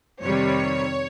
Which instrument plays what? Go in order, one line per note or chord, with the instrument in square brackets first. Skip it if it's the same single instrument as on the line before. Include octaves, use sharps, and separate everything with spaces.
[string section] F2 C3 D#3 G3 C#5